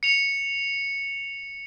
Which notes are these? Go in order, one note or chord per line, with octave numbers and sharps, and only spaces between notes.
C#7 F7